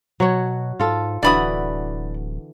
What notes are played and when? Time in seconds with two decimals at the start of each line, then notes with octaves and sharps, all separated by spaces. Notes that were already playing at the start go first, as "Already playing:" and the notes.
0.20 B2 F#3 F#4 C#5
0.80 G#2 F4 A4
1.23 D1 D3 E3 F#4 D5 B5 D#6